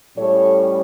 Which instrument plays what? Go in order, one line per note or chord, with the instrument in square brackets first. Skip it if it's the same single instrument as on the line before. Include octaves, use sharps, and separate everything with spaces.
[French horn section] A2 G3 C#4 A4 C#5